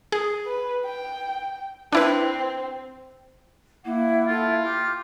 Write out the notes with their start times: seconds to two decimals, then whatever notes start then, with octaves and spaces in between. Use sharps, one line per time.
0.12 G#4
0.46 B4
0.85 G5
1.93 C4 D4 E4 B4
3.85 A#3 E4 F#5
4.27 E4 F4 A4 F5
4.62 G4 F6